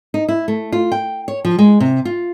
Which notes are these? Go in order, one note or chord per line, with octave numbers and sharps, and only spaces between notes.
D#4
E4
A3
F4
G5
C#5
F3
G#3
C3
F4